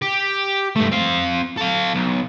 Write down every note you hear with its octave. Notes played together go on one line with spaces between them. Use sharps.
G4
G2 A3
C4 F5
A4 F5
B1